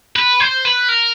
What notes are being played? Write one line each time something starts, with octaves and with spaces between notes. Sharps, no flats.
B4
C5
B4
A#4